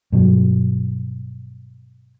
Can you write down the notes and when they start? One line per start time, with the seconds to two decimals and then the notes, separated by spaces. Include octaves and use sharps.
0.12 G2 B2 F#3